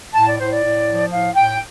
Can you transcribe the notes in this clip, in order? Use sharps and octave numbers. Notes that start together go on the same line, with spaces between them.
A2 A5
D5
A2 C5
D5
A2
F3
A2 F5
A2 G5